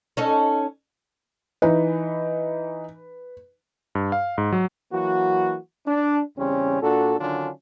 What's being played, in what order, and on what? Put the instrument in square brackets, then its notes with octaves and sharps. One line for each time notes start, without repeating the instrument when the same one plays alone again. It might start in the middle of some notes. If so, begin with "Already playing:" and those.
[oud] C#4 D#4 A4
[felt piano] E3 D#4 [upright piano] B4
[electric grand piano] G2
F5
G#2
F#3
[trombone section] E3 F#3 A#3 F#4
D4
E2 C#3 G3 C4 C#4
A#2 D4 F#4 A4
D3 D#3 F#3 C#4 D4 F4